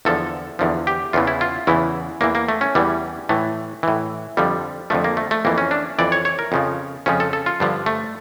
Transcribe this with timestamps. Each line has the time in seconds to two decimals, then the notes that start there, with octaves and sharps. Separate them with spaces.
0.05 E2 D3 F3 A4
0.59 E2 D3 F3
0.87 G4
1.13 E2 C#3 E3 F4
1.27 E4
1.41 F4
1.67 E2 C#3 E3 E4
2.21 E2 E3 A#3
2.35 A#3
2.49 A3
2.61 C#4
2.75 E2 E3 G3
3.29 A2 E3 A3
3.83 A2 E3
4.37 F2 D3 F3 G3
4.90 F2 D3 F3 A3
5.04 A#3
5.17 A3
5.31 A3
5.45 F2 E3 A#3
5.58 C#4
5.71 D4
5.99 F2 E3 D5
6.12 C#5
6.25 C#5
6.39 A#4
6.52 F2 C#3 F3
7.06 F2 C#3 F3 C#4
7.20 A4
7.33 A4
7.46 F4
7.60 G2 D3 F3
7.86 A3